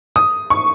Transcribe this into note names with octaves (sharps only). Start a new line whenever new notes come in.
D#6
C#6